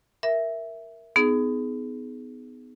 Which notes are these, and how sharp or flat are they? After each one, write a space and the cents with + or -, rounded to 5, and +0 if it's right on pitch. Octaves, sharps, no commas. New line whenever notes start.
A#4 +0 E5 +0
B3 +30 D#4 +0 G#4 +20